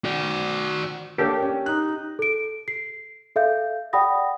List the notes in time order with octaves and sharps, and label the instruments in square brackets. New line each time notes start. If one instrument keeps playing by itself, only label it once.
[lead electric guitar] F#4 D5
[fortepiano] A#3 A4 [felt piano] D4 C#5 G5 [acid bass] G4
[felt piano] C#4
[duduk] D#4 [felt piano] F#6
[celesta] A4 D7
C7
A4 E5 F5 G6
D5 F#5 G5 B5 D#6 A#6